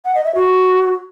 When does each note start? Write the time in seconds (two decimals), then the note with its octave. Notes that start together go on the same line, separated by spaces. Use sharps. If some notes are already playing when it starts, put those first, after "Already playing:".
0.05 F#5
0.15 D#5
0.25 E5
0.35 F#4